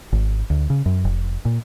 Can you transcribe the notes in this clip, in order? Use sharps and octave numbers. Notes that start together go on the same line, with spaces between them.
G#1
D2
C#3
F#2
F1
A#2